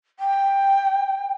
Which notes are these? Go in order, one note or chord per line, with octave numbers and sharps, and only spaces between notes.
G5